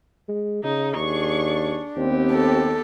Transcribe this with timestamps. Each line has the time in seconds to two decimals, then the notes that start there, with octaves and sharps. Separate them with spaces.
0.28 G#3
0.64 C#3 D#4
0.96 D#2 D4 G#4 C#6
1.97 D#2 B3 C4 G4
2.32 A4